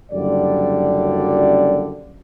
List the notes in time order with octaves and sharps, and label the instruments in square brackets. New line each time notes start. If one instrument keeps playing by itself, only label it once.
[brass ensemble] F#1 F#2 D3 G3 D5